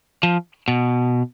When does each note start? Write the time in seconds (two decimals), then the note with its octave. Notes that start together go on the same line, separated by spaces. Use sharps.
0.23 F3
0.68 B2